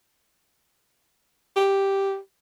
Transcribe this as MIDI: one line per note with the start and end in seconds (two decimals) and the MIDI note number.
1.56 2.17 67